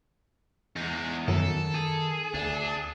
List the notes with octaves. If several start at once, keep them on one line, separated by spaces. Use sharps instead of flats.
E2 G#3 D#4
F#2 D#3 A4
G#4
D2 D4